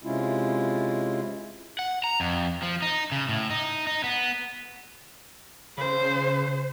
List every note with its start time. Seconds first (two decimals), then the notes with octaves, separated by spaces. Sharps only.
0.04 C3 G#3 C#4 E4 F4
1.79 F#5
2.04 A#5
2.20 F2
2.63 F3
2.82 D#4
3.12 C#3
3.29 A2
3.50 D#4
3.87 D#4
4.04 B3
5.78 C#3 C5